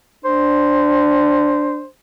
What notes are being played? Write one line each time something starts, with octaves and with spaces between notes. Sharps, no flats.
D4 C5